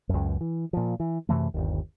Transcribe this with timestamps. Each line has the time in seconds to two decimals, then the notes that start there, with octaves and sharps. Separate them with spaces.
0.09 C#2 F#2
0.41 E3
0.73 A#2 F3
1.00 E3
1.29 F#2 C3 E3 A3
1.54 G1 D#2